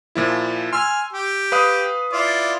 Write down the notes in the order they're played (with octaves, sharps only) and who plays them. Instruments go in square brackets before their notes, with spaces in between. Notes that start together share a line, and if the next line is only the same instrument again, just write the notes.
[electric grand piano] A#2 F3 E4
[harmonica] G#5 F6 [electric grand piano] C6 E6
[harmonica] G4
[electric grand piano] B4 F5 D#6
[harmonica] E4 F4 D5